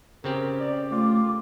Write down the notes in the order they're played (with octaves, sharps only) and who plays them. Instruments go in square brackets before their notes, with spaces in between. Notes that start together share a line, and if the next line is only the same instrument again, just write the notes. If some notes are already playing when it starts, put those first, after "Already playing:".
[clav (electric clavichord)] C#3 C4 G4 [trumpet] A#4
[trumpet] D5
[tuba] A3 [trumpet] F4 [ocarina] D6